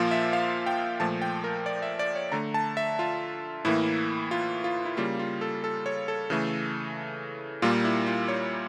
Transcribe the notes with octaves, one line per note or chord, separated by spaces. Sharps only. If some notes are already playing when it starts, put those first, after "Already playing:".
Already playing: A#2 F3 A#3 F4
E5
F5
G5
A#2 F3 A3 A5
G5
A#4
D5
E5
D5
C#5
D3 A3 A#5
A5
E5
F4
A2 E3 A#3 E4
F4
F4
E4
C#3 G3 A#3 F4
F4
A4
A4
C#5
A4
C#3 E3 A3
A#2 G3 A#3 F4
E4
F4
C#5